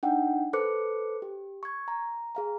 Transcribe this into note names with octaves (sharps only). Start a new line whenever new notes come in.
D4 D#4 F#5 G5
A4 B4 C5 D6 F#6 C#7
G4
C#6 G#6
A#5
G#4 F5 A#5